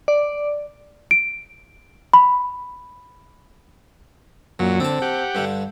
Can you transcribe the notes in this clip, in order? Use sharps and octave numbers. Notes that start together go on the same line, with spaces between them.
D5
D7
B5
F#2 A#2 F#3
D3 C4 A5
G4 F#5
G2 D3